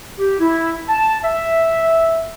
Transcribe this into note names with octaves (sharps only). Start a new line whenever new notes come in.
G4
E4
A5
E5